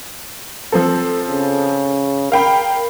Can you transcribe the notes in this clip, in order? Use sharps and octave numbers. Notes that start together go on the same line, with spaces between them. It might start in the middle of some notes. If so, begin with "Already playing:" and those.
F3 C4 A4
C#3
A#4 F5 G5 B5